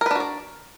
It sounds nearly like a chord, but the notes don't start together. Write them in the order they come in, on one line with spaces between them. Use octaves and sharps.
A#4 B4 D4 F#4 D5